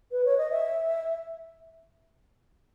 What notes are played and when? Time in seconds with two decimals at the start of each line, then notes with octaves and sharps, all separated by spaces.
0.11 B4
0.25 C#5
0.37 D#5
0.51 E5